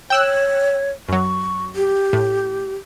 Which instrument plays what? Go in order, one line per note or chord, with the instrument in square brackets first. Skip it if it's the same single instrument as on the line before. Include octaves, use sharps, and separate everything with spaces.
[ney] C#5 [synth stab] G5 E6 F#6
[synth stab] F#2 F#3 [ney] C#6
[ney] G4
[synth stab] A2